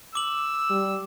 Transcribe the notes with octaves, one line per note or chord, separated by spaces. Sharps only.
D6 E6 F#7
G3